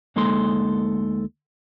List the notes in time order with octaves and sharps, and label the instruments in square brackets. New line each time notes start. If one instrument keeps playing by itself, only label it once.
[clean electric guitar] D2 G#3 A#3 D#4 A4 C6